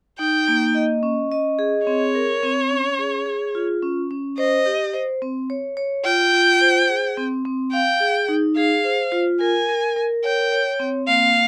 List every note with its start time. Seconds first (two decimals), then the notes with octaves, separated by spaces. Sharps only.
0.19 D#4 G5
0.48 A#3
0.75 D#5
1.03 C#4
1.31 D#5
1.59 G#4
1.86 C4 C#5
2.15 A#4
2.43 C4
2.71 C#4
2.99 G#4
3.26 G#4
3.55 F4
3.82 C#4
4.11 C#4
4.38 C5 D#5
4.66 G4
4.94 C5
5.22 C4
5.50 C#5
5.77 C#5
6.05 F4 G5
6.33 F4
6.61 C5
6.89 G#4
7.17 C4
7.45 C4
7.72 F5 G5
8.00 G#4
8.29 D#4
8.57 G#4 F5
8.84 C5
9.12 F4
9.41 A#4 G#5
9.69 A#4
9.96 A#4
10.24 C#5 G5
10.52 C#5
10.79 C4
11.08 A#3 F5